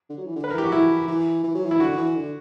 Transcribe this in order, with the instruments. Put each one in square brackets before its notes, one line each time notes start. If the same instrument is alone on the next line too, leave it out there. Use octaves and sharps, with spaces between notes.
[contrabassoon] D3
F#3
E3
D3
[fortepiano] B4
A#4
[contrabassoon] E3 [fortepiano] G4
[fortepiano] F#4
[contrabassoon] E3 [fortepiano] E4
[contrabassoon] E3
E3
F#3
E3
[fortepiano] E4
[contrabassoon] D3 [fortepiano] F#4
[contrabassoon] E3
D3